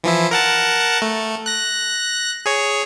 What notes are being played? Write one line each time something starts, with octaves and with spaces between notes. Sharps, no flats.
E3 F3 E4
A#4 F#5 A5
A3
F#6 A#6
G#4 C#5